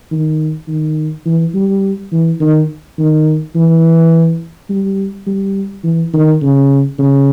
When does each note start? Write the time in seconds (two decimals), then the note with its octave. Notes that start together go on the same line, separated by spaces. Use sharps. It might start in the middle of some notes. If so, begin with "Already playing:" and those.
0.11 D#3
0.68 D#3
1.25 E3
1.54 G3
2.12 E3
2.40 D#3
2.98 D#3
3.55 E3
4.69 G3
5.27 G3
5.84 E3
6.14 D#3
6.42 C#3
6.99 C#3